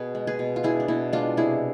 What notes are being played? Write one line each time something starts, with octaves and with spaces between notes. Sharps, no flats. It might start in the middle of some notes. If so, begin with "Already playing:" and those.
Already playing: B2 G#4 B4
G#3
G#4 B4
B2
F4
D4 E4 G#4
D4
B2 E4
G#3 D4 F4
C3 E4 G#4